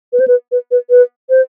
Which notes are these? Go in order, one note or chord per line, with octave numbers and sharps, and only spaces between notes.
B4
C5
B4
B4
B4
B4
C5